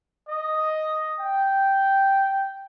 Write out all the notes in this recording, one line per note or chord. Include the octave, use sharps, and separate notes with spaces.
D#5
G5